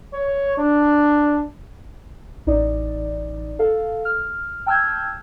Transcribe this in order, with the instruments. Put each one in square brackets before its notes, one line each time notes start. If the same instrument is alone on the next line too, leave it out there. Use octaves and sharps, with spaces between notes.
[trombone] C#5
D4
[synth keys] A1 D#4 D5
A4 F5
F6
G5 A5 E6 F6 G6 G#6